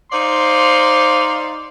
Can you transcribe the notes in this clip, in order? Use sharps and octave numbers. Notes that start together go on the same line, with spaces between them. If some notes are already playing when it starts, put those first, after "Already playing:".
D#4 C5 D5 F5 C6